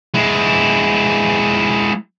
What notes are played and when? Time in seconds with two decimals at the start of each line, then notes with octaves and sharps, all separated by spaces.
0.14 G#3 E4